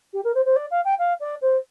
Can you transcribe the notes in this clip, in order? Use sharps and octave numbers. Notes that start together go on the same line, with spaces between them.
G4
A#4
C5
C5
D5
F5
G5
F5
D5
C5